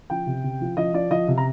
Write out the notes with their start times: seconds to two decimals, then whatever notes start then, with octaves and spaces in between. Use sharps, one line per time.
0.10 F3 G5
0.26 C3
0.44 C3
0.61 F3
0.77 F3 D#5
0.93 F3 D5
1.10 F3 D#5
1.27 C3
1.38 A#5